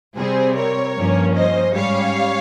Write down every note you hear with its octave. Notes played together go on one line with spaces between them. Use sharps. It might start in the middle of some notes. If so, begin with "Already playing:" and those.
C3 G3 C4 G#4 C5
A#4 C#5
G2 F3 A#3 C#4
C5 D#5
G#2 G3 C#4 C#5 F5